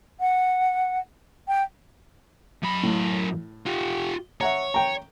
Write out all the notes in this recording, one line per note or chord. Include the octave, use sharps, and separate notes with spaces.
F#5
G5
F#2 B5
A2
F4 G4
C#5 E5 F#5 A#5
G5 A#5